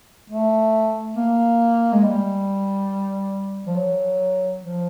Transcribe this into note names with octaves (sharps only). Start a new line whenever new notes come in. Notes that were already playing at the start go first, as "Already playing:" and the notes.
A3
A#3
G#3
G3
F3
F#3
F3